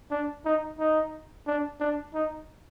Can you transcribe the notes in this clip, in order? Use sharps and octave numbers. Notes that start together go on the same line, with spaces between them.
D4
D#4
D#4
D4
D4
D#4